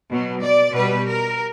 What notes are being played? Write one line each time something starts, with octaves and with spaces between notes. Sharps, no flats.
B2 F#3
D5
B2 G3 B4
A#4